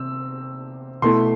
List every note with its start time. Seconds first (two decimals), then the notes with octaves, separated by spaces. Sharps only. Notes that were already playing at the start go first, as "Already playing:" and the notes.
Already playing: C3 C4 E6
1.02 B2 A3 E4 C6